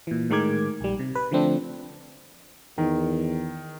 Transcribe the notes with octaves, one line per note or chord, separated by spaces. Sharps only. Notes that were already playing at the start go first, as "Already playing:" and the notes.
A#2 E3
A2 D#3 G#3 A#4 D6 G#6
A#1 G3
C3
B4
D3 F3 A3 C4 D4
E2 D#3